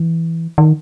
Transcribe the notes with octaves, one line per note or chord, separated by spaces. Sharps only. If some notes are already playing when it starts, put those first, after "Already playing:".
Already playing: E3
D#3